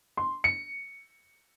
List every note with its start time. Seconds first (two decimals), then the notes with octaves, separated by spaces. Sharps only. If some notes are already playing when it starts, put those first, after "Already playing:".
0.17 C6
0.44 C#7